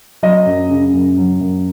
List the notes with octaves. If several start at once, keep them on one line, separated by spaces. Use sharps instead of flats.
F#3 D#5
F#2
C#3
F#2
F#3
F#2